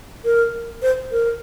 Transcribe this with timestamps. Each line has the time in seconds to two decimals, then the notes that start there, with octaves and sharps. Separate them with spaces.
0.25 A#4
0.82 C5
1.12 A#4